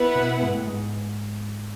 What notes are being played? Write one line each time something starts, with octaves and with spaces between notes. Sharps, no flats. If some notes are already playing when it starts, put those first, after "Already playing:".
Already playing: B3 E4 B4 F#5
B2
G#2
A2
G#2